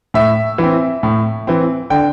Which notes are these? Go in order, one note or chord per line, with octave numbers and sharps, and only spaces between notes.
A2 E5
E3 C4
A2
E3 C4
D3 G5